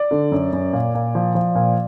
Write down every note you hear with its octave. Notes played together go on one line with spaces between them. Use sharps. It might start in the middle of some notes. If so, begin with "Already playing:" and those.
Already playing: D5
D3
F#2
F#2
A#2
A#2
F3
F3
A#2